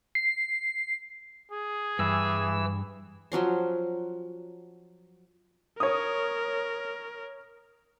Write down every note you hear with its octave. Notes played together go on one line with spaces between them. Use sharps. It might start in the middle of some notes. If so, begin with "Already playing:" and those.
C7
G#4
G2 E3 E6
F3 F#3 C#4 C6
A#4 C#5 D#6